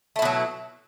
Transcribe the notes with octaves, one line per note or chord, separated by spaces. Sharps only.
B2 F#3 A3 E4